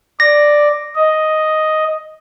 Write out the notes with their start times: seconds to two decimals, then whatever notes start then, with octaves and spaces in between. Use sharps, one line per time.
0.20 D5 A#6
0.95 D#5